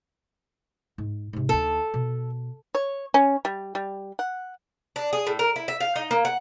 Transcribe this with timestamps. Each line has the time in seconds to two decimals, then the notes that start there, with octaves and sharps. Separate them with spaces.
0.98 G#2
1.33 G#2 C3
1.49 D2 D#4 A4
1.94 B2
2.75 C#5
3.14 C#4
3.45 G3
3.75 G3
4.19 F#5
4.96 D4
5.13 G#4
5.27 A2
5.39 A#4
5.56 E4
5.68 E5
5.80 F5
5.96 D#4
6.11 A#3
6.25 F#5